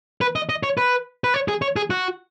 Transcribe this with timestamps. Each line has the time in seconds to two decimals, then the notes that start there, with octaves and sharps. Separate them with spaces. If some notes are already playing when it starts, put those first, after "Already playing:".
0.21 B4
0.36 D#5
0.49 D#5
0.63 C#5
0.77 B4
1.24 B4
1.34 C#5
1.48 G#4
1.62 C#5
1.76 G#4
1.90 F#4